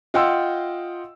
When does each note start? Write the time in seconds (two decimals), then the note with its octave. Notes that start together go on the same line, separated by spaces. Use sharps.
0.14 F4 D#5 F#5 G5 C6 E6